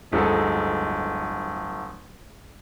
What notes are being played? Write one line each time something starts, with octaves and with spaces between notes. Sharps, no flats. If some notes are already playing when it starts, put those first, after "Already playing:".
D1 G1 F3 G#3 D#4 A4